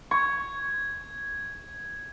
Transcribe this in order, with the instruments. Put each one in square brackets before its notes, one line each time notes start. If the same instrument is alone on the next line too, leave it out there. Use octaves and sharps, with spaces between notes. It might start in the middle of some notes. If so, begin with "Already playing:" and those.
[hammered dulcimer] C#6 [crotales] G#6